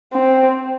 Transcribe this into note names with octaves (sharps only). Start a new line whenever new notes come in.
C4